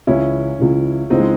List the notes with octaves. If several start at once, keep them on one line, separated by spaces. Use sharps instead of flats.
C#2 C#3 E3 C#4 E4
C#2 C#3 E3
C#2 C#3 E3 C4 D#4
G#3